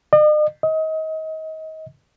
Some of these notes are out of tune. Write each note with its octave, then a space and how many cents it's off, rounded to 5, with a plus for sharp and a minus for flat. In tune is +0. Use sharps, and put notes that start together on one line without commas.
D#5 -45
D#5 +30